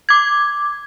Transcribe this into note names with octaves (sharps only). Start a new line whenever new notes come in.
D6 G#6